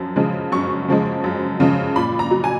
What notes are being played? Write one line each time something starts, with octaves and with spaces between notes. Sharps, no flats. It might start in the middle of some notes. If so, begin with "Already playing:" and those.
Already playing: F#2 F3
C#3 F3 G#3
F#2 C#6
C#3 F3 G#3
F#2
C#3 F3 G#3
A#2 B5
A#5
F#3
G#5